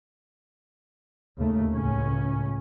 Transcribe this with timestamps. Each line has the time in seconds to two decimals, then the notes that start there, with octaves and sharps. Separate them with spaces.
1.36 D#2 C#3 A3
1.73 C#2 A2 C#4